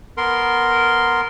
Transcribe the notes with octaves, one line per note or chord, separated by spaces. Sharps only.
B3 A#4 C6